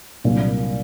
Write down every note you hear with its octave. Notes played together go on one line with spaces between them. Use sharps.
C2 A#2 F#3 A#3 D4